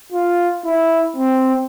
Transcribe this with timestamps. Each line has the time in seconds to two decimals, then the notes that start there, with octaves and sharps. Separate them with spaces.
0.12 F4
0.65 E4
1.17 C4